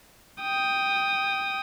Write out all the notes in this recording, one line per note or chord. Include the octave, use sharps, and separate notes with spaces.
G5 D#6